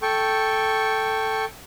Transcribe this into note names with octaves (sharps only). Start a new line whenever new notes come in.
A4 G5 C#6